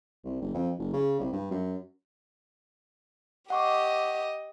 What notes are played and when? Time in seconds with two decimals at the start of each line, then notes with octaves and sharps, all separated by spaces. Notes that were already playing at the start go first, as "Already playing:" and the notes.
0.24 C2
0.42 F#1
0.54 F2
0.79 F#1
0.93 C#3
1.20 C2
1.32 G2
1.51 F#2
3.50 G4 D#5 F#5 C#6 D6